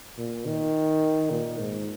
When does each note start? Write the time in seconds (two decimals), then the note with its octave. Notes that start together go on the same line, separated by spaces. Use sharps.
0.18 A#2
0.46 D#3
1.30 A#2
1.58 G#2